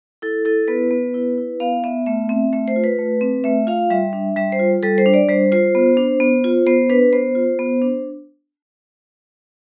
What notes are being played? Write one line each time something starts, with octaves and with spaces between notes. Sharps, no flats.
E4 A4
E4 A4
B3 B4
B3
E4
E4
B3 F5
B3 E5
A3 E5
C4 E5
A3 E5
C5
F4
B4
A3
C4
A3 E5
F4 F5
G3 E5
D4
G3 E5
C5
F4
G3 A4
C5
D4
D5
G3 C5
F4 C5
B3
D4
B3
F4
B3 C5
D4 B4
B3 C5
F4
B3
D4